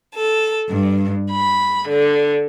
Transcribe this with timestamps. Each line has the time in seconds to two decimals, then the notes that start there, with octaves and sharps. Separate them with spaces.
0.17 A4
0.70 G2
1.31 B5
1.88 D3